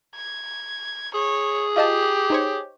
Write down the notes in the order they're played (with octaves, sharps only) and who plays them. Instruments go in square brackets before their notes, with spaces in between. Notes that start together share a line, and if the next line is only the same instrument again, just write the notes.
[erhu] G#6
[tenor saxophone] G#4 [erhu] C#5
[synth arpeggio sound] F4 D#5 A5 [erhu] G4
[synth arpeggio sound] D#4 C5 C#5